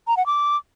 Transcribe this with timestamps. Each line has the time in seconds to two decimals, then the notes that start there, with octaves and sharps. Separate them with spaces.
0.08 A#5
0.17 F#5
0.26 D6